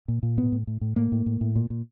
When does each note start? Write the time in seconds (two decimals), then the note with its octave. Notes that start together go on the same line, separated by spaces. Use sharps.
0.08 A#2
0.23 A#2
0.38 A2 B3
0.52 A2
0.67 A2
0.81 A2
0.96 A2 A#3
1.12 A2
1.26 A2
1.41 A2
1.56 A#2
1.70 A#2